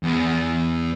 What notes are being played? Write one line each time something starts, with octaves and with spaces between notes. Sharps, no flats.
E2